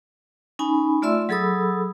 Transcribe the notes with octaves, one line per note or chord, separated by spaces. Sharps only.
C#4 D#4 G#5 B5
A3 F4 D5 E5 C6 E6
F#3 G#4 A4 B5 D#6 E6